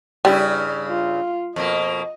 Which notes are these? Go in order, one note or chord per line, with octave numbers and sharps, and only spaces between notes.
G2 C#3 G3 E4
F4
F2 B2 A#3 D#5